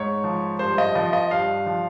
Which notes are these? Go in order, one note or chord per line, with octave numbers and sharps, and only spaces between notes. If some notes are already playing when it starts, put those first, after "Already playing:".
Already playing: G#2 C#5
F3
G2 C5
D#5
F3 D#5
D#5
G2 F5
F3